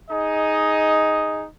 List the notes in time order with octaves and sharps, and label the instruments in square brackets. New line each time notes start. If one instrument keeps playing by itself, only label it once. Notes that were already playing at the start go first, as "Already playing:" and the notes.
[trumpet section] D#4 G#4 D#5